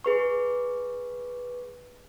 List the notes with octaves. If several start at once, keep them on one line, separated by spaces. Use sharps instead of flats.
G#4 B4 C#6